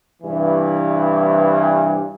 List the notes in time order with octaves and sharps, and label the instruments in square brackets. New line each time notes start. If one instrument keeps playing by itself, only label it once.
[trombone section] G2 C3 E3